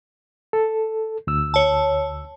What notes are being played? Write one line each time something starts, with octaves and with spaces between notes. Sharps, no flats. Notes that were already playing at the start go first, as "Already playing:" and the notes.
A4
D2 E6
C#5 A5